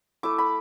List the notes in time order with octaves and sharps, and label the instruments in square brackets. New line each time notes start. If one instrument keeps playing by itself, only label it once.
[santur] A3 E4 D6
B5